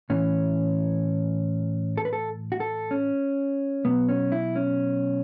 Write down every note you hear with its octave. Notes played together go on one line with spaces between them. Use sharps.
A2 E3 C#4
A4
B4
A4
F#4
A4
C#4
B2 F#3 B3
C#4
E4
C#4